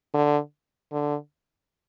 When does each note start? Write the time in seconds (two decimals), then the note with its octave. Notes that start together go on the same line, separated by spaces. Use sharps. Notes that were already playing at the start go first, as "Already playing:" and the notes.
0.14 D3
0.92 D3